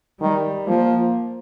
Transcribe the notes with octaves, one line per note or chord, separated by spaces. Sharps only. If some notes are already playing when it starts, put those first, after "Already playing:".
D#3 G3
F3 A#3